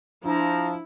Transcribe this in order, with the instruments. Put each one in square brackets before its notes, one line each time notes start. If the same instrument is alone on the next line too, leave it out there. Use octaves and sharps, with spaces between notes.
[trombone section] F3 [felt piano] D4 [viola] E4 [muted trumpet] A#5